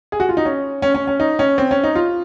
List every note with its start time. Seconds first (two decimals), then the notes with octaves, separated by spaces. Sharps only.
0.12 G#4
0.20 F#4
0.29 F4
0.37 D#4
0.45 C#4
0.82 C#4
0.95 C#4
1.07 C#4
1.20 D#4
1.39 C#4
1.58 C4
1.71 C#4
1.83 D#4
1.96 F4